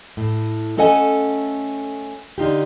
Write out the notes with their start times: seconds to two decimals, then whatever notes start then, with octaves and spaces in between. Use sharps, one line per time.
0.17 A2
0.77 A3 C#4 A4 D#5 F#5 G#5
2.38 D3 D#4 F4 G4